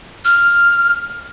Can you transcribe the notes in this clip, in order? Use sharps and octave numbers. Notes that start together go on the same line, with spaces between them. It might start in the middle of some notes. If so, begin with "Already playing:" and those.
F6